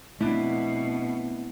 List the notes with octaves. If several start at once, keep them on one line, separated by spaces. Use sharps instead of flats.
B2 A3 B3 C4 D4 E4